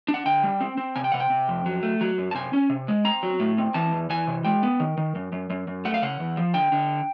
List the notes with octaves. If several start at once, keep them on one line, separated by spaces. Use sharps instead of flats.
D4
F#5
D3 G5
G3
C4
C4
C3 G#5
G5
C3 F#5
G5
C3
F2
F#3
A3
F#3
F#2
A5
C3 G#5
C#4
C3
G#3
C4 A#5
F#3
A2
C4
E3 A5
E2
E3 G#5
C3
G#3 G5
B3
D#3
D#3
F#2
F#2
F#2
F#2
A3 F#5
F5
C#3 F#5
E2
F3
D3 G5
D3